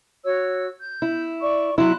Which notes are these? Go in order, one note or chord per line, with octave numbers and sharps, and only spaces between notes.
F#4 C#5 E6
G6
E4
D5 C#6
F#3 E4 C6 F#6